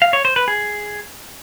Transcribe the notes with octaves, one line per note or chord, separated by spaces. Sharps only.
F5
C#5
C5
B4
G#4